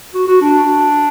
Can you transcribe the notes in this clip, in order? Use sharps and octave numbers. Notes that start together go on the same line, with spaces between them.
F#4
F#4
D4